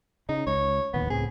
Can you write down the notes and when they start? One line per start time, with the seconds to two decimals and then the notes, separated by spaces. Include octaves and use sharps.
0.29 C#3 D#4
0.47 C#2 C#5
0.94 D1 D#2 B3
1.10 C#2 A2 C4 G#4